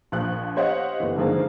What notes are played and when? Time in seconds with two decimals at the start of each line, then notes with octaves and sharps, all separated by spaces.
0.12 A#1 F3 F#6
0.56 G4 C5 C#5 D#5 F5 F#5
1.00 G1 E3
1.16 D3 D#3 F3 G#3 A#3 C4